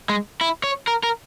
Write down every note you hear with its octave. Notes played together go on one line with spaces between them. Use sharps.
G#3
E4
C#5
A#4
A#4